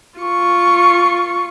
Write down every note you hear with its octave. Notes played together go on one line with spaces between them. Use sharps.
F4 C#6